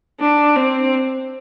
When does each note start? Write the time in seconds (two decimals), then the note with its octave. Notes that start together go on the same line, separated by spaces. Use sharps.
0.20 D4
0.56 C4